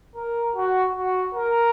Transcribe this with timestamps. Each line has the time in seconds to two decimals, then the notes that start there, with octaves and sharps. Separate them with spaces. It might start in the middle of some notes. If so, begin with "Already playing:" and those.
0.16 A#4
0.56 F#4
0.96 F#4
1.35 A#4